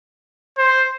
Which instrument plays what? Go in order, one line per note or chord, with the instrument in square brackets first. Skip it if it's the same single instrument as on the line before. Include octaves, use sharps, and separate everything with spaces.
[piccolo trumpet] C5